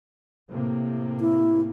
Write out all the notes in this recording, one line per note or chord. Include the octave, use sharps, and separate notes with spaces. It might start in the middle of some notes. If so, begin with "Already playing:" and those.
A2 C3 A#3
E4